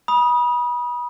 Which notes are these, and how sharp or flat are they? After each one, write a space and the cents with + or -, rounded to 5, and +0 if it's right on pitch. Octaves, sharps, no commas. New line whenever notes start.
B5 -30 D#6 +0